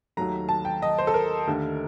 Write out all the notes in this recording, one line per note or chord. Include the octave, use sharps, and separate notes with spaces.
D#2 D#3 F#3 A3 A#5
A5
G5
D#5
C5
A4
A#4
D#2 D3 A3